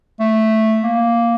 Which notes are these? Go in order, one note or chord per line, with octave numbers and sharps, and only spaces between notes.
A3
A#3